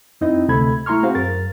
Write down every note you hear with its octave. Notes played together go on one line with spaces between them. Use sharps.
F2 C4 D#4 E4 D#5
D2 C3 A3 A4 B5 G#6
A3 E4 A#5 C6 C#6 F6
C4 F#4 G#4 C5 F5
F#2 A#4 A6